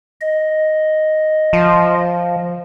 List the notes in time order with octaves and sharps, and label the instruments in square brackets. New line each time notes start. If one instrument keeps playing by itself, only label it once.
[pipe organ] D#5
[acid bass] F3